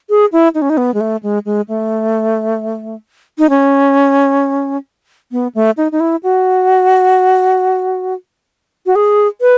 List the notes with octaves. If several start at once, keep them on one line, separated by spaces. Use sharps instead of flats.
G#4
E4
D#4
C#4
D#4
B3
G#3
A3
G#3
G#3
A3
D#4
C#4
B3
A3
D#4
D#4
E4
F#4
F#4
G#4
B4